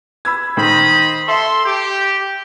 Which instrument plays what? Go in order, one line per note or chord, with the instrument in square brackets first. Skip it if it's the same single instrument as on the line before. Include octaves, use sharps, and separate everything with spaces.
[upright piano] B5 E6 G#6
[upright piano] D#3 [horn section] C5 D#5 B5
[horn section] A4 C6 [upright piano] E5
[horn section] G4